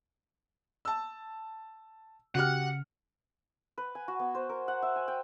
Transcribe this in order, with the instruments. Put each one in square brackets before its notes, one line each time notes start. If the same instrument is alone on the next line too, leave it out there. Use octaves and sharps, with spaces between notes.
[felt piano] A5 E6
[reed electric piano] C#3 [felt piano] F#4 G4 F6 [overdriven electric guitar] F#5
[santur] B4
G#5
F#4
B3
C5
A#4
F#5
E5
G#5
G5